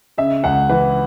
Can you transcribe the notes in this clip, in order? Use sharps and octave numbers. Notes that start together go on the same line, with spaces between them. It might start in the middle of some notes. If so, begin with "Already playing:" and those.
C#3 E5
C#2 F#5
E3 B4